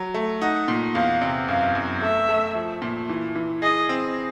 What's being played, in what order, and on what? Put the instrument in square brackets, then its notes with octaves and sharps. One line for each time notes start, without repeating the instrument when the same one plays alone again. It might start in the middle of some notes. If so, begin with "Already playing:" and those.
Already playing: [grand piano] F#3
A3
[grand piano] D#4 [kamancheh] F#5
[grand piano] A#2
[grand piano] E2 [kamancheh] F5
[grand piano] C3
[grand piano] F#2 [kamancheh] F5
[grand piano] F#2
[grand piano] A3 [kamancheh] E5
[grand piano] A3
F3
A#2
E3
E3
[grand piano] G#4 [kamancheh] D#5
[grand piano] C4